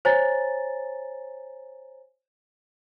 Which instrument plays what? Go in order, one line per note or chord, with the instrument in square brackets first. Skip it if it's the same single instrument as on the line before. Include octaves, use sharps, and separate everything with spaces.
[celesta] C5 C#5 G#5 A#5 A6